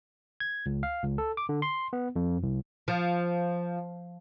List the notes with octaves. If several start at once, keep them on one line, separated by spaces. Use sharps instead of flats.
G#6
C#2
F5
C#2
A4
D6
D3
C6
B3
F2
C2
F3